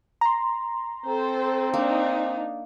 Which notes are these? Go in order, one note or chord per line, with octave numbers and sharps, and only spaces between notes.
A#5 C6
C4 A4 C5
A#3 D4 D#4